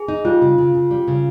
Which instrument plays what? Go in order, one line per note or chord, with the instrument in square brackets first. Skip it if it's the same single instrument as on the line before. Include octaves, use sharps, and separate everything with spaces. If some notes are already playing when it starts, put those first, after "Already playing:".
Already playing: [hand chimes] G#4
[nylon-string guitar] D#4
[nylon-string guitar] G3 [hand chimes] F4
[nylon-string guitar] C#3
C#3
C#3
G3
C#3